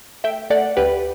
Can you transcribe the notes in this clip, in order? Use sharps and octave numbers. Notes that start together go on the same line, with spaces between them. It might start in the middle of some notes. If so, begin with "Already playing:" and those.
A3 E5 G5
A3 D5 F#5
D2 G4 B4